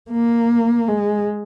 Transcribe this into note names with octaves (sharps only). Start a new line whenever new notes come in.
A#3
G#3